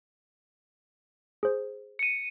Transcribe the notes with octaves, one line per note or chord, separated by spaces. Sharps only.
G#4 C5
C#7 D#7